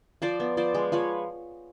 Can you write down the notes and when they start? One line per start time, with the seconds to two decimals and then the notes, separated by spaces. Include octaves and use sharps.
0.22 F3 C5 D5
0.40 B3
0.57 F3 C5 D5
0.74 G#3
0.92 F3 B4 C#5